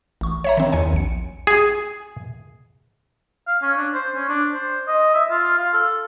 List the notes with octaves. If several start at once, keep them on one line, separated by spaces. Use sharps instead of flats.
A1 C#6
C#5 E5 A#5
D#3 C4
E2 C#5 G#5
A#1 C#7
G#4
F5
C#4
D4
C5
C#4
D4
C5
D#5
E5
F4
F5
A4